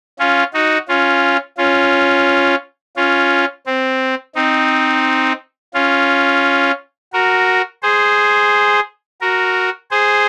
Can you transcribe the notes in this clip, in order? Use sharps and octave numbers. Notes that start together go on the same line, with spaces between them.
C#4 F4
D#4 F#4
C#4 F4
C#4 F4
C#4 F4
C4
C4 D#4
C#4 F4
F#4 A#4
G#4 C5
F#4 A#4
G#4 C5